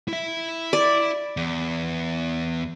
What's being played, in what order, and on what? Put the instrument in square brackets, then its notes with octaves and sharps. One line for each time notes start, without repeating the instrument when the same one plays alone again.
[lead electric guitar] E4 E5
[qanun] D5
[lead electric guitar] E2